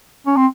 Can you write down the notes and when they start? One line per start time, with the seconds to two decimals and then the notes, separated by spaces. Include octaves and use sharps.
0.27 C#4
0.37 C4